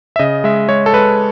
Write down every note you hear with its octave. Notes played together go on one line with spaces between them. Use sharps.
E5
C#3 D#5
G#3 E5
G#3 C#5
A4
G#3 B4